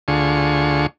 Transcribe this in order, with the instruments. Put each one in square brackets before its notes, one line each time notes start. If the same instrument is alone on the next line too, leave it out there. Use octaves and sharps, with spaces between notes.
[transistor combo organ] D2 D3 F4 G#4 C#6